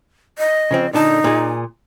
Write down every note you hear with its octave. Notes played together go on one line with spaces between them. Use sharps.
D#5
C#3 F3 C4
A#2 D3 D#4 A5
A#2 G#4